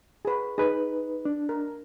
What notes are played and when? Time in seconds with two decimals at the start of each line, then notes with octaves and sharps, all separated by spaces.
0.25 G#4 B4
0.58 D#4 G#4 B4
1.25 D4
1.49 A#4